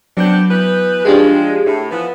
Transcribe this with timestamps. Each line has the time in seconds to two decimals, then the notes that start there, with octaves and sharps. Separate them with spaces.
0.17 F#3 B3 C4 D4 G6
0.50 E3 B3 B4
1.05 F3 G#3 D4 G4 G#4
1.66 A2
1.91 E3 F3 B3